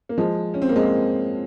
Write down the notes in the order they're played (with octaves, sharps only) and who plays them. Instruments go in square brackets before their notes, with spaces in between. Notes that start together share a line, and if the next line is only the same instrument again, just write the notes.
[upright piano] A#3
F3 G#3
C#4
C4
A#3
G#3 C4